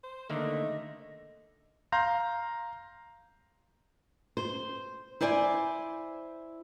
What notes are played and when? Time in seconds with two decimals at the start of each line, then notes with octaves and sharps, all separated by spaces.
0.04 C5
0.30 D3 D#3 A3 A#3 D#5
1.92 F5 A#5 C6 G6 A#6
4.37 C5
5.21 E4 C5 D5 G#5